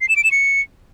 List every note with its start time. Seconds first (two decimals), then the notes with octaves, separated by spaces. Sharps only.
0.01 C7
0.09 E7
0.16 D7
0.24 E7
0.32 C#7